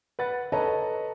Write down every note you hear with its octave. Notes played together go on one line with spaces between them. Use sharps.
B4 F#5 A6
A4 B4 C#5 D#5 A5 A#5